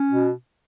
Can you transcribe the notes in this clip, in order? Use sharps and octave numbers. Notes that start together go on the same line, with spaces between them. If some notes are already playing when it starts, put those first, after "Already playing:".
Already playing: C#4
B2